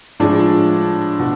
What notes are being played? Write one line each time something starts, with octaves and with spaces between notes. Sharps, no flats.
A2 F3 G#3 D4
B2